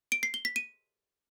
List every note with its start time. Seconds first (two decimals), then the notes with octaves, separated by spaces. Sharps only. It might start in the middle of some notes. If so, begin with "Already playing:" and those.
0.12 D7
0.23 C7
0.34 G7
0.45 B6
0.56 D#7